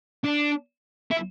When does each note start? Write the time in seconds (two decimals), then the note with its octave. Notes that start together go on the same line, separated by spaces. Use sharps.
0.24 D4
1.11 E4